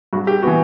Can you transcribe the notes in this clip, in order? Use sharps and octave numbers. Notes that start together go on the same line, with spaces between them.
G2 F#4
G4
E3 B3 F#4